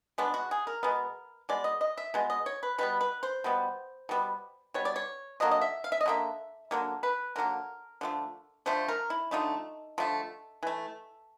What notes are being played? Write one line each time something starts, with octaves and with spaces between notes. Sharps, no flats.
B2 G#3 B3 D4
F#4
G#4
A#4
B2 G#3 B3
B2 G#3 D5
D#5
D#5
E5
B2 G#3
D#5
C#5
B4
B2 G3 B3 B4
B4
C5
B2 G3 B3
B2 G3 B3
B2 G3 C#5
D5
C#5
D3 F#3 A#3 D#5
D#5
E5
F5
E5
D#5
D3 F#3 A#3 E5
D3 F#3 A#3
B4
D3 F#3 A#3 A#4
D3 F3 A3
D3 F3 A3 C5
A#4
E4
D3 F3 A3 D#4
D3 F3 A3
E3 A3